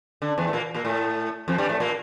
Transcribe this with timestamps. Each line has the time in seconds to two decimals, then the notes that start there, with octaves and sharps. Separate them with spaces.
0.22 D3
0.38 E2 E3
0.48 A3
0.53 A#2 A#3
0.74 A#2 A#3
0.85 A2 A3
1.48 F2 F3
1.58 G2 G3
1.69 A2 A3
1.80 A#2 A#3